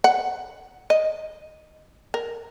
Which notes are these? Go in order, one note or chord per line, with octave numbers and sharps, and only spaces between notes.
F#5
D#5
A#4